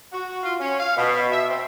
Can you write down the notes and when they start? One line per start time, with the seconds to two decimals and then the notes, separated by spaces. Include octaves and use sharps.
0.12 F#4
0.43 F4
0.60 C#4
0.80 F5
0.97 B2
1.31 E5
1.49 C4